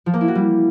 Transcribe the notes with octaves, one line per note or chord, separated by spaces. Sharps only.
F3
A#3
E4
F#4
G3